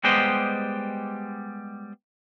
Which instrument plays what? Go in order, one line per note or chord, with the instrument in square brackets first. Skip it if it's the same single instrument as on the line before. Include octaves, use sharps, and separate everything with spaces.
[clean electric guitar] G3 G#3 B3 G4 C5 D#5